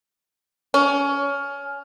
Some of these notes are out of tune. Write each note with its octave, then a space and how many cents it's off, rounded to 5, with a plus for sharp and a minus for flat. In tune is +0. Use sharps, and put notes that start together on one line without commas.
C#4 +20